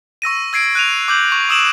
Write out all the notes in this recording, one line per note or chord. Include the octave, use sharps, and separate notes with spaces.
C#6 E6 A#6 D#7
E6 G#6 C7 D7
F#6 D#7 F7
D6 G6 F#7
C#6
C#6 D#6 E6 D7 E7 F#7